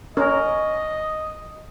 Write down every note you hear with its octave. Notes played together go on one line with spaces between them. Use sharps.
C#4 A#4 D#5